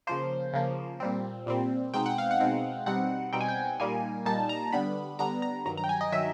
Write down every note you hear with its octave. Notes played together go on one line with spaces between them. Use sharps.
C#3 F3 A#3 C5
C#3 F3 A#3
A#2 G3 C4
A#2 G3 C4
B2 G#3 C4 D#4 G5
F#5
F5
F#5
B2 G#3 C4 D#4
B2 G3 C4 D#4 F#5
B2 G3 C4 D#4 G5
G#5
G5
A#2 G3 A#3 D#4 G#5
A#2 G3 A#3 D#4 A5
A#5
D3 G3 B3 D4 B5
D3 G3 B3 D4 A#5
A#5
G2 D#3 F#3 A#5
A#5
G5
G#5
D#5
D#3 F#3 E5